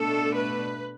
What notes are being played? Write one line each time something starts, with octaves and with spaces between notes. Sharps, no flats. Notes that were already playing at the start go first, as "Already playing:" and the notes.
Already playing: B2 A3 D4 A4
B4